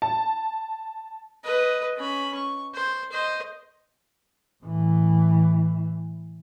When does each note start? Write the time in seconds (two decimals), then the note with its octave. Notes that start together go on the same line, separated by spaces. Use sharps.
0.02 A5
1.44 B4 D#5
1.96 C#4 B5
2.35 C#6
2.75 C5
3.12 C5 D#5
4.64 A2 E3